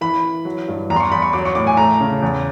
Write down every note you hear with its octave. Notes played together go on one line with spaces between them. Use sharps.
E3 B5
E3
F#3
G2
E2 A#5
C6
C#6
E2 B5
C#6
F#3 D6
C#6
A2 D6
G#5
A3 A#5
C#3
E2